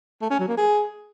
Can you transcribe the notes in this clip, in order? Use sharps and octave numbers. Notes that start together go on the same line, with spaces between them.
A3
C#4
F#3
A#3
G#4